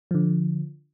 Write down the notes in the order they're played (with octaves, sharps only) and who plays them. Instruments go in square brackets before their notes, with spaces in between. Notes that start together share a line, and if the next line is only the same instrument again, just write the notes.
[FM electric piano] D3 F3